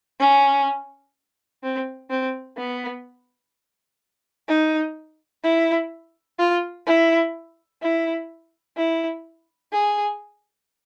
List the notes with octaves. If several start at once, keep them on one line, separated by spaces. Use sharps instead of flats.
C#4
C4
C4
B3
D#4
E4
F4
E4
E4
E4
G#4